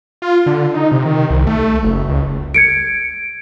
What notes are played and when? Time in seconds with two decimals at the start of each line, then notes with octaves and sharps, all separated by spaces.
0.22 F4
0.46 D3
0.74 D#4
0.92 C3
1.05 D#3
1.30 C2
1.47 A3
1.83 F#1
2.09 C#2
2.54 G#6 C#7 D7